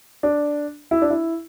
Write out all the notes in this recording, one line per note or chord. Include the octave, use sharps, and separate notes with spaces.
D4
E4
D4
E4